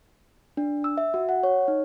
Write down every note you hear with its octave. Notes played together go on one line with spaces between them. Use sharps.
D4
E6
E5
F#4
F#5
C#5
D#4